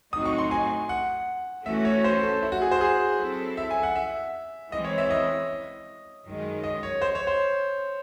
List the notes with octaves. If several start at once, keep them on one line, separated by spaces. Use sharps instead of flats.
A2 F#3 C4 D#4 F#4 D#6
C#6
C6
G#5
F#5
E3 A3 C#4 F#4 E5
C#5
C5
A4
E4
F#4
G#4
C5
G#4
F#3 C4 E4 A4
E5
G#5
F#5
E5
E3 G#3 C4 D#5
C#5
E5
D#5
F#2 D#3 G#3
D#5
C#5
C5
C#5
C5